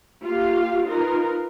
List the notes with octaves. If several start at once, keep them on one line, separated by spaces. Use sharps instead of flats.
A#3 F4 G4 F5
D#4 F4 A#4 B4